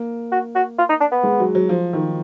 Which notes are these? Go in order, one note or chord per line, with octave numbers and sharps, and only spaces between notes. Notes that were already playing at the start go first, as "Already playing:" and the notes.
Already playing: A#3
F#4
F#4
F4
D#4
D4
B3
G#3
F#3
F#3
F3
D#3